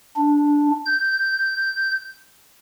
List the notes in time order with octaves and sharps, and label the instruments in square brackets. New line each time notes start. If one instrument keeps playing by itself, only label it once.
[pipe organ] D4
G6